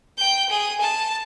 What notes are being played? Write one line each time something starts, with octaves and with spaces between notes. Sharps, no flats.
G5 G6
G#4 D#7
A5